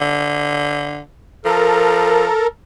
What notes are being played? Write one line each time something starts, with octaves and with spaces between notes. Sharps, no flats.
D3
F3 A4 A#4